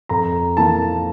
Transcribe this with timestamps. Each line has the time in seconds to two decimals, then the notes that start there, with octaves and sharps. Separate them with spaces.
0.09 F2 A#5
0.57 E3 A#3 A5